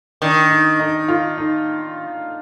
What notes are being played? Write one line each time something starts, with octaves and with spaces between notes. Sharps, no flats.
D#3 D4
D#4
D#4
F4
D#4